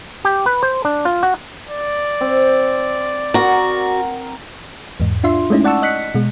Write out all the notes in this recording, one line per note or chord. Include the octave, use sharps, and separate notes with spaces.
G4
B4
C5
D4
F4
F#4
D5
C4
F#4 A#4
E2 G#2
D4 F4 E5 C6
G#3 A3 C#4 D#4 E4
D5 F#5 A5 C#6 E6
D#5 F#6 B6 C#7
B2 G#3